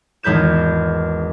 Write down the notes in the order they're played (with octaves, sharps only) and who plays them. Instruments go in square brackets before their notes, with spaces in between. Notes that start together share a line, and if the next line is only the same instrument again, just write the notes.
[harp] G#1 E2 B4 G6 E7